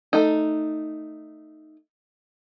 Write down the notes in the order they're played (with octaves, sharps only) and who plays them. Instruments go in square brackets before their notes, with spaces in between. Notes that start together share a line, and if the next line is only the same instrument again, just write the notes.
[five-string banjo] A3 D#4